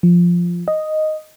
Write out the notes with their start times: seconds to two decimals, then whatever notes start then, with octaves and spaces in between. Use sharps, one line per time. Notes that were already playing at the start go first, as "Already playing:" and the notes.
0.03 F3
0.68 D#5